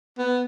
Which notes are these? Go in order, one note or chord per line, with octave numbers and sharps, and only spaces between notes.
B3